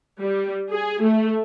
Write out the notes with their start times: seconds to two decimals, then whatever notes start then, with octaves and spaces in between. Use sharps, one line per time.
0.20 G3
0.70 G#4
1.02 A3